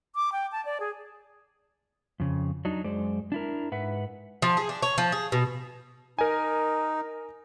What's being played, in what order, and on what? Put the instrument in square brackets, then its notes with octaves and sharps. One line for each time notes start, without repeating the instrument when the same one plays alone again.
[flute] D6
G5
A5
D5
G#4
[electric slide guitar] F2 C#3
F#3 D4 D#4
F#2 G#3 C5 D5
D4 E4 A#4
G#2 B4 E5 F#5
[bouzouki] F3
G#4
D4
C#5
F3
G#4
B2
[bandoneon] D#4 [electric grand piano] A#4 G#5